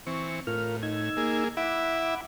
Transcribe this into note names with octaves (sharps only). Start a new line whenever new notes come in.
E3 C4 C#6
A2 F4 A#4 F6
D#4 E6 G#6
A#3 G#4
E4 E5 F#5 B5 D6